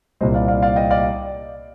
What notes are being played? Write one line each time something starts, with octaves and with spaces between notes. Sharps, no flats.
C2 A#2 G3 C5 D#5
D5 F5
D5 F5
D5 F5
D#5 G5
D5 F5